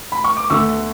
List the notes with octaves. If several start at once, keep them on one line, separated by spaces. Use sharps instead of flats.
B5
C#6
D6
D2 D3 A3 C#6 E6